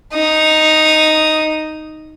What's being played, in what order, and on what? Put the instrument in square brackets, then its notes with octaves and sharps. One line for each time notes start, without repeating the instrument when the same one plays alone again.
[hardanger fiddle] D#4 D#6